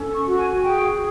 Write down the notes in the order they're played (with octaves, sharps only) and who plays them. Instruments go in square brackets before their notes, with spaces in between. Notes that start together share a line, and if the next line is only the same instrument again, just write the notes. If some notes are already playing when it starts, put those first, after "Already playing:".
Already playing: [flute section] C#4 A4
C#6
F#4
G#5
G#4 G5